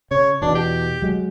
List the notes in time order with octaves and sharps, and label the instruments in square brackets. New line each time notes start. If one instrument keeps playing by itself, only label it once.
[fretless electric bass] C#3 [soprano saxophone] C#5
[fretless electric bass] E2 B2 [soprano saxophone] D4
[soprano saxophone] G4
[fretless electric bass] F#3 G#3